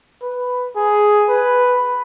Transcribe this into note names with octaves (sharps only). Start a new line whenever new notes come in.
B4
G#4
B4